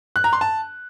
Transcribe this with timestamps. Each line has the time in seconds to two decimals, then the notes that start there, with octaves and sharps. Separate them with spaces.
0.16 F#6
0.24 A#5
0.33 C6
0.41 A5